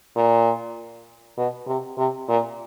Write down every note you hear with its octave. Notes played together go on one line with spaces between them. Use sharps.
A#2
B2
C3
C3
A#2